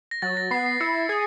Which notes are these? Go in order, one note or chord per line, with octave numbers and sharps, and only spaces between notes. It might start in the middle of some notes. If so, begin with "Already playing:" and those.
A#6
F#3 A6
A#6
B3 C7
C7
E4 C#7
G#4